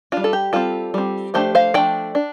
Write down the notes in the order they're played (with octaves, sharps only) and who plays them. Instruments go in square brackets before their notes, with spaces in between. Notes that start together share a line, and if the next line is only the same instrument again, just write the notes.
[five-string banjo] G3 D4 F4
A4
G4
G3 C4 F4 A4
G3 C4
F3 A3 D4 G4 C5
C5 F5
F3 A3 D4 D5 G5
D4